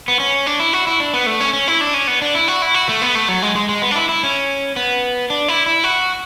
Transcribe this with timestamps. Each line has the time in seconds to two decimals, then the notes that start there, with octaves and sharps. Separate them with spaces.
0.08 B3
0.20 C#4
0.46 D4
0.60 E4
0.73 F#4
0.87 E4
1.00 D4
1.13 B3
1.26 A3
1.40 C#4
1.53 C#4
1.68 E4
1.81 D4
1.94 C#4
2.07 B3
2.22 D4
2.35 E4
2.48 F#4
2.62 E4
2.74 F#4
2.89 A3
3.02 B3
3.15 A3
3.29 F#3
3.42 G#3
3.56 G#3
3.69 G#3
3.82 B3
3.91 D4
3.96 E4
4.09 E4
4.23 C#4
4.76 B3
5.30 D4
5.48 E4
5.66 E4
5.84 F#4